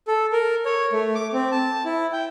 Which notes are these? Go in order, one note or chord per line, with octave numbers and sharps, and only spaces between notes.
A4
A#4
C#5
A3
D6
C4
A5
E4
G5